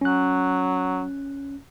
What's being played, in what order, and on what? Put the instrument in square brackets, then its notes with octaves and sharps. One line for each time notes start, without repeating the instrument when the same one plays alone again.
[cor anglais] F#3 [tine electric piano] C#4 F#6